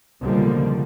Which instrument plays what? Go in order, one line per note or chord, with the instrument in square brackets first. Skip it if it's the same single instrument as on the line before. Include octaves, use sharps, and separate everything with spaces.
[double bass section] C#2 B2 D3 F3 G3 A#3